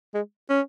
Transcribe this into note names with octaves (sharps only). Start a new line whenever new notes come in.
G#3
C#4